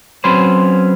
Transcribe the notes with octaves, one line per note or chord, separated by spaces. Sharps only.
F#3 C4 C#4 B4 C5